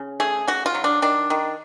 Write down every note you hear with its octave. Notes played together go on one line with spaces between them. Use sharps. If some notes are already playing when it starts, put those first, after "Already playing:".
Already playing: C#3
A3 G#4
C#3 F#4
F4
F#3
D4
D#3 D4
D#3